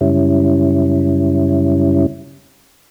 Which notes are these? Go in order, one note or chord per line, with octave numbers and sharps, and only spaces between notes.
F#2 C#3 G3 C#4 E4